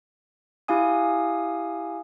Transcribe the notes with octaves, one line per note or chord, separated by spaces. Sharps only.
E4 G4 F5 G#5 D#6